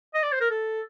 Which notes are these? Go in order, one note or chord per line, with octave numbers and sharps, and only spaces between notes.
D#5
D5
C5
A#4
A4